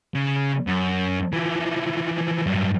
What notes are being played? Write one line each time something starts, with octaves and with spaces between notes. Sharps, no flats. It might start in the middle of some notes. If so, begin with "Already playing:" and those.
C#3
F#2
E3 F3
G2 F#3